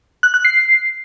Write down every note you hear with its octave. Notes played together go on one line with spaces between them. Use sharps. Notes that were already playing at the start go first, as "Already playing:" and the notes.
F#6
F#6
C7